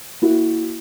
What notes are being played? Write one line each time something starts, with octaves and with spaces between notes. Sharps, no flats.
A#3 E4 F#4